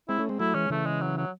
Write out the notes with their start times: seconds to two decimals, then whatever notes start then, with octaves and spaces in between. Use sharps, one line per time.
0.09 G#3 C4 E4
0.19 A3 C#4
0.29 G#3 C4
0.39 F#3 A3 E4
0.55 E3 G#3 C#4
0.70 C#3 E3 A3
0.86 G#3
1.01 F#3
1.17 F#3